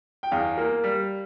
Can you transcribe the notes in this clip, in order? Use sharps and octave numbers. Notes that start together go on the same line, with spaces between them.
G5
E2 F5
A#3
G3